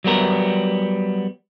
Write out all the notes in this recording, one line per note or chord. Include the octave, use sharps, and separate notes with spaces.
F#3 G3 B3 A#4